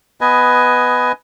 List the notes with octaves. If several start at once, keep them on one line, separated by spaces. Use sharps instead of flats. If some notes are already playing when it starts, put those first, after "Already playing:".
B3 B4 D#5 G#5